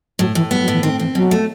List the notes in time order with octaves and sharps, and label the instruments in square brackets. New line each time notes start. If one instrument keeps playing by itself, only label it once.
[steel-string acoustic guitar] A2 [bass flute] F#3
[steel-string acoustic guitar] A2 [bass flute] E3
[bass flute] G3 [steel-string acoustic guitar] B3
[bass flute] F#3
[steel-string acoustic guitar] A2 [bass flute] E3
[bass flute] D#3 [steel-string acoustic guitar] C4
[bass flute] E3 [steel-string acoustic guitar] C4
[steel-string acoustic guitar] B2 [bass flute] F#3
[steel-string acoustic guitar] A3